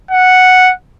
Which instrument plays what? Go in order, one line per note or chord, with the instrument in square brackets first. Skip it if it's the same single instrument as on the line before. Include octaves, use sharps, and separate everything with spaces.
[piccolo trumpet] F#5